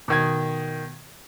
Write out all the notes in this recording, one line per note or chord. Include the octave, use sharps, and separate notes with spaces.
B2 D#3 G#6